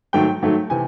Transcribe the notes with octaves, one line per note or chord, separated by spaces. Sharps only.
G#2 D#3 F#3 A3 G5
G#2 D#3 F#3 A3
C3 E3 G#5